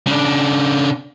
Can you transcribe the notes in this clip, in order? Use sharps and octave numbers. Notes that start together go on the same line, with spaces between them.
C#3 D4